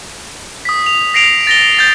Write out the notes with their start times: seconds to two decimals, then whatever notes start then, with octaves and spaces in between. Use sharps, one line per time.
0.65 D#6 B6
0.86 F7
1.14 A#6 C7 D7 F7
1.47 A6 A#6 G7
1.79 G6 A6